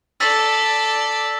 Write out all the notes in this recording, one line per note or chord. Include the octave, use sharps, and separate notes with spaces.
A4 D5 E6 A6 B6